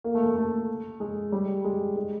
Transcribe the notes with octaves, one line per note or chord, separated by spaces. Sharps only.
A#3
A3
A3
A3
G#3
G3
G#3
G#3